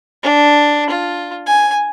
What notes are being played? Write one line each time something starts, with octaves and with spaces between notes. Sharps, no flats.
D4
F4
G#5